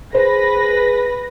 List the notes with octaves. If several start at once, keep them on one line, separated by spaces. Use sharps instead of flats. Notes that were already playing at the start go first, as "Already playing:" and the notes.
G#4 B4 C5 A#6